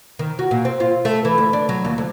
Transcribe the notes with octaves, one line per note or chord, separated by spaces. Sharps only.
D#3
F#4
A#2
C4
F4
A3
E3
D2
D4
F#3
D#2
D2